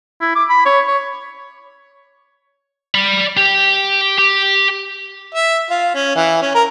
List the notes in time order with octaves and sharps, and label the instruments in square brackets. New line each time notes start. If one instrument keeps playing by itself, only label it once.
[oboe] E4
D6
B5
C#5
C#5
[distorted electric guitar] D5 B5
G4
G4
[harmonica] E5
F4
C#4
E3
C#4
A#4